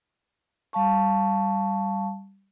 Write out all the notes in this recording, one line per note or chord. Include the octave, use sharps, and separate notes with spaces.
G3 F5 A5 C#6